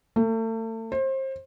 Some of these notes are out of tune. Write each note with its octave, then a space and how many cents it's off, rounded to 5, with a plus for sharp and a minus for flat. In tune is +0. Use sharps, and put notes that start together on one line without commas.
A3 +35
C5 +30